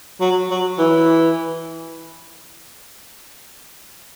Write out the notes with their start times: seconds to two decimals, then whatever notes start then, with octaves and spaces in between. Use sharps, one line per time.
0.21 F#3
0.50 F#3
0.79 E3